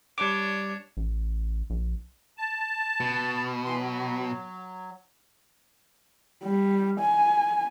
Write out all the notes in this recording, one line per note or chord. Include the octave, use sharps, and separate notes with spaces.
G3 D4 C#5 D6
A1
A#1
A5
B2
E3 C6
F#3
G3
G#5